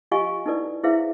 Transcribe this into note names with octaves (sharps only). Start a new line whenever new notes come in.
F4 G4 D#5 F5 G#5 C#6
D#4 E4 A4 B4 D5
E4 G#4 B4 C5 E5 F5